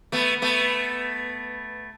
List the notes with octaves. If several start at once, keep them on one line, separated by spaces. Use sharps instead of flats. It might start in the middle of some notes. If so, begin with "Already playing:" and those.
A3 B3
A3 B3